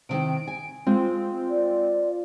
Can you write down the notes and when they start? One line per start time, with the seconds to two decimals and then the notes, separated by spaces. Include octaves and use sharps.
0.09 C3 D#3 C4 D7
0.48 G#5
0.87 G#3 C4 F4
1.49 D5